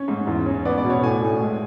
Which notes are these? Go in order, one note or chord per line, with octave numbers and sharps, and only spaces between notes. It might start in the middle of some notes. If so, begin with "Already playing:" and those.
Already playing: C#4 C#5
G#2
E2
C#4
B3 D5
D5
B2
C#5
A2 G#5
A2
G#3